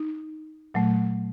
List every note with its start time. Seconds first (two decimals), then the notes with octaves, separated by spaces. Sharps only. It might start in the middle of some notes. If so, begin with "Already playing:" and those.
Already playing: D#4
0.74 A#2 F#3 A3